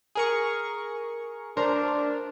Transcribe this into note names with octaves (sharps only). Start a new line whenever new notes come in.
G#4 A#4 C#6
D4 A#4 C5 D5